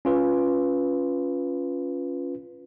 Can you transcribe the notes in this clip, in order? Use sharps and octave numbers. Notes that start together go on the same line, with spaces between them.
C#4 F4 B4